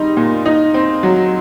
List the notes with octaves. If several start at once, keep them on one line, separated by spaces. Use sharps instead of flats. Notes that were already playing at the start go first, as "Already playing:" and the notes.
Already playing: G3 C4 D#4
A#2
D#4
C4
F#3